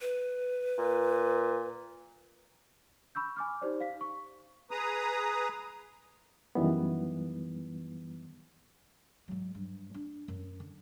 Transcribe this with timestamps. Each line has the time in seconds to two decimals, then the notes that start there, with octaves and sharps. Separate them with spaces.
0.01 B4
0.78 A#2
3.15 B5 C#6 E6 G6
3.36 G#5 D6 F6
3.61 D#4 G4 C5 D5
3.80 F5 B6
4.01 C#6
4.71 G#4 B4 A#5 D#6
6.55 F#2 D#3 E3 G3 B3
9.28 G#2 F#3
9.55 G2
9.94 D4
10.28 F#2
10.60 D3